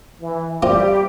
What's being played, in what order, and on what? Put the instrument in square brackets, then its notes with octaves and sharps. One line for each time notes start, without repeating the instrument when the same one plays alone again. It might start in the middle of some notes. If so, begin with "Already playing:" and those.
[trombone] E3
[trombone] G3 [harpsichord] A#3 C4 F4 [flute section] G4